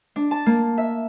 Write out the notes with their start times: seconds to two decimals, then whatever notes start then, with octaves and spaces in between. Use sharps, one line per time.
0.16 D4
0.31 A5
0.46 A#3
0.78 E5